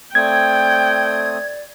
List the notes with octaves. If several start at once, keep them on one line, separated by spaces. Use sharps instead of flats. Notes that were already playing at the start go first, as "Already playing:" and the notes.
A3 C4 D5 G5 D#6 G#6